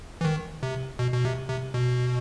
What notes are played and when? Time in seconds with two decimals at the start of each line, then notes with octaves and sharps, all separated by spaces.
0.21 E3
0.24 D#3
0.63 C3
0.99 B2
1.13 B2
1.25 C3
1.49 C3
1.74 B2